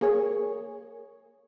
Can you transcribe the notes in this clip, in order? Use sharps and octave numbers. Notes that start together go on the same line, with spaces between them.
A#3 G#4 C#5